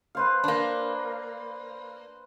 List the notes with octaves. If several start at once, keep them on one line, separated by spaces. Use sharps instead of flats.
B4 C5 F5
A#3 D4